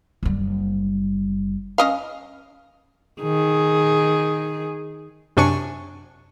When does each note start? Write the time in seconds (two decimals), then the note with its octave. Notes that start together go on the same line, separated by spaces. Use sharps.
0.23 F#1 G3
1.78 C#4 D#5 F5
3.22 D#3 G#4
5.37 F#2 C3 D4 G#5 C#6 C#7